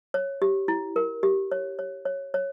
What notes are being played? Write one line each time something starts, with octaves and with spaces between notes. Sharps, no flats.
C#5
G4
E4
A#4
G4
C#5
C#5
C#5
C#5